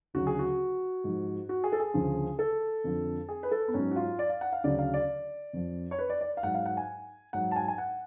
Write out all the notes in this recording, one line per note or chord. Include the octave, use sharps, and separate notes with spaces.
D2 C#3 F#3 F#4
G#4
F#4
G#2 F3
F#4
G#4
A4
G#4
D2 C#3 F3
A4
F2 D3 F3
G#4
B4
A4
B3
G#2 F#3 C#4
F#4
F4
D5
F5
F#5
F5
D2 C#3 F#3 D5
F5
D5
F2 F3
C#5
B4
D5
D5
F5
G#2 F#3 F#5
F5
F#5
G#5
G#2 F#3 F#5
A5
G#5
G#5
F#5